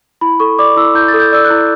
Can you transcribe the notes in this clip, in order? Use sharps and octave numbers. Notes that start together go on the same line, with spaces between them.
E4 B5
A4 C#6
D5 D6
E4 E6
E4 G6
A6
A4
G6
D5 E6
F#6
E4